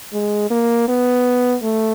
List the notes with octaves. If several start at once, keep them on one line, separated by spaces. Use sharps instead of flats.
G#3
A#3
B3
A3